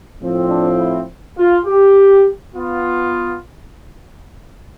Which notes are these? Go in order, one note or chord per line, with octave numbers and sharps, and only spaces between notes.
A2 F3 C4
D4
E4
F4
G4
B3 F4